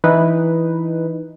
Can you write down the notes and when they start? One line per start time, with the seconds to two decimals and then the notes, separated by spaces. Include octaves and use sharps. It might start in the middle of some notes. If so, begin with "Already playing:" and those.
0.04 E3 D#4 B4